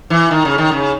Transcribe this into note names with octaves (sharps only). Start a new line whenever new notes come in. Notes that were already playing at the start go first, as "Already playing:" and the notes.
E3
D#3
C#3
D#3
C#3